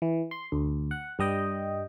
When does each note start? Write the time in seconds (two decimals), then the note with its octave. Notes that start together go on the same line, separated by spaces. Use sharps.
0.02 E3
0.31 C6
0.52 D2
0.91 F#5
1.19 G2 G3 D#5 G5